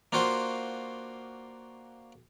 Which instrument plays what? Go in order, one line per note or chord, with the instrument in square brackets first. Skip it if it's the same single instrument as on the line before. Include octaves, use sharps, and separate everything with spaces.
[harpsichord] A#3 D4 F4 F#4 C5